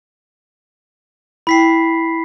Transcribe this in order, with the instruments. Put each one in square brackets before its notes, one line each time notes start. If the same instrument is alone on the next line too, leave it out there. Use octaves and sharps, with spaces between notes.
[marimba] E4 G5 [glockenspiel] B5 B6 C7